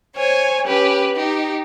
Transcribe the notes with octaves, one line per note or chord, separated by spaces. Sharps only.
C5 C#5 G#5
C#4 G4 B4
D#4 G4